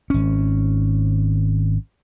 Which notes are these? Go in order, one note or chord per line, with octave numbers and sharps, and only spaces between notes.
G#1 C#4